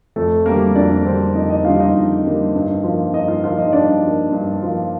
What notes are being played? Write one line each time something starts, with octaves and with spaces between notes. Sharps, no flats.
F2 A3 A4
D3 G3 A#3 A#4
F2 D4 D5
D3 G3 A#3 C4 C5
F2 D#4 D#5
D#4 D#5
D3 G3 A#3 F4 F5
D#4 D#5
F2
D3 G3 A#3
G2
F3 A#3
G2 D#4 D#5
F4 F5
F3 A#3 F4 F5
D#4 D#5
G2 D4 D5
F3 A#3
G2
F3 A#3